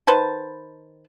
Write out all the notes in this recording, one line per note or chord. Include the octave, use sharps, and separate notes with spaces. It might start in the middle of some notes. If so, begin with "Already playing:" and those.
D#3 B4 C5 A5